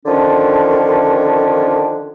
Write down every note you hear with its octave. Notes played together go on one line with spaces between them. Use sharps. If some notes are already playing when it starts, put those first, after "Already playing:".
D3 D#3 F3 C#4 D4